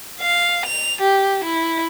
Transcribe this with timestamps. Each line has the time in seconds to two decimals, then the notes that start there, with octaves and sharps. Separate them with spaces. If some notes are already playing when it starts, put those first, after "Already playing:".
0.21 F5
0.66 F7
1.01 G4
1.44 E4